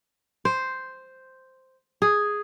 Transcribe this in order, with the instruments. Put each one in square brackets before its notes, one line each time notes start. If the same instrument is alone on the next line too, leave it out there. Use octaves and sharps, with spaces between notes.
[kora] C5
G#4